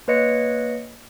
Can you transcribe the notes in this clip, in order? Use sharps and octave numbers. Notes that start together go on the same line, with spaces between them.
A#3 B4 C#5 D#5 C#7